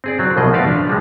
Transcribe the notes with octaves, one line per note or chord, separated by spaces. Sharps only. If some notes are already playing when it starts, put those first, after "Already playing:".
C4 G#4 D5
F#3 C4
C2 B2 F3 D#5
F3 A3 A4 B4 D5 F5
D4
F3 G3 G#3